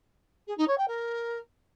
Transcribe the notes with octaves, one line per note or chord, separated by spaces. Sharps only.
G#4
D#4
C#5
G5
A#4